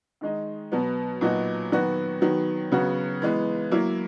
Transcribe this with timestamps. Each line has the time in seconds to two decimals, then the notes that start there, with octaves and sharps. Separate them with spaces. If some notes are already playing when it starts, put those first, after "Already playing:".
0.21 D#3 G#3 D#4
0.72 B2 F#3 B3
1.21 A#2 F#3 B3 D#4 F#4
1.72 D#3 F#3 B3 F#4
2.22 D#3 F#3 B3
2.72 C#3 F#3 B3 F#4
3.22 E3 G#3 B3
3.71 F#3 A#3 E4